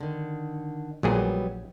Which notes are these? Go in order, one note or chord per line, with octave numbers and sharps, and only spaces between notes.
D3 D#3
A#1 A#2 F#3 G3 B3 G#4